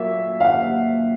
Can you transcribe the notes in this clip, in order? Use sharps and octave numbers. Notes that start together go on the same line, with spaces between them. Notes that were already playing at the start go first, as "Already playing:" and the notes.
Already playing: A#2 F#3 A#3 E5
F5
F#5